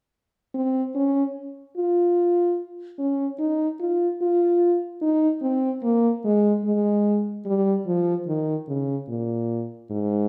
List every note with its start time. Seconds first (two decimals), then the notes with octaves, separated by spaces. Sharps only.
0.55 C4
0.95 C#4
1.77 F4
2.99 C#4
3.40 D#4
3.80 F4
4.21 F4
5.02 D#4
5.42 C4
5.83 A#3
6.25 G#3
6.65 G#3
7.46 G3
7.87 F3
8.27 D#3
8.68 C#3
9.08 A#2
9.90 G#2